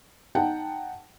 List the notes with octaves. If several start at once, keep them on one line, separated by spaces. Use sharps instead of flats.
D#4 F#5 G5 A5